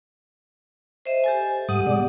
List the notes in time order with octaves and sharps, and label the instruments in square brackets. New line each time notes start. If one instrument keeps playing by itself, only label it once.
[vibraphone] C5 D#5 E5
G4 A4 G#5
[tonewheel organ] G#2 G3 D#6 [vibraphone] G4 F#5
[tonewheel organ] B2 G#3 D5